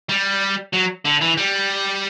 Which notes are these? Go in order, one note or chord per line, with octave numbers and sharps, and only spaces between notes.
G3
F#3
D3
E3
G3